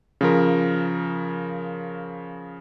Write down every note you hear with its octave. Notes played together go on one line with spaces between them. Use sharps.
C#3 F3 A#4